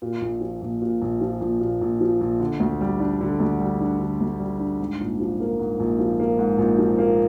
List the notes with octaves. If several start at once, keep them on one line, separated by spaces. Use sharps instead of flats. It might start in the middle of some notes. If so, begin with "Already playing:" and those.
A#2
A#1
F3
A#1
A#2
A#1
F3
A#1
A#2
A#1
F3
A#1
D3
D2
G3
D4
D3
D2
G3
D4
D3
D2
G3
D4
G#2
A#1
F3
A#3
G#2
A#1
F3
A#3
G#2
A#1
F3
A#3